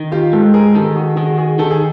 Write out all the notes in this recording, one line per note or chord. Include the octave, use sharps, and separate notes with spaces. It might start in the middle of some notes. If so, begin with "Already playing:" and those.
Already playing: D#3
F4 G4
G#2 G4 A4
G#4 A#4
D#3 G4 A4
F#4 G#4
D#3 F#4 G#4
F#4 G#4
D#3 G4 A4
G#4